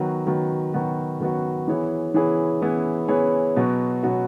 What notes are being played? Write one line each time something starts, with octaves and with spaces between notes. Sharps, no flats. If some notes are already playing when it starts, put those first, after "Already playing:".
Already playing: D#3 F#3 B3 F#4
D#3 F#3 B3 F#4
D#3 F#3 B3 F#4
D#3 F#3 B3 F#4
E3 B3 E4 G#4 C#5
E3 B3 E4 G#4 C#5
E3 B3 E4 G#4 C#5
E3 B3 E4 G#4 C#5
B2 F#3 B3 F#4
B2 F#3 B3 F#4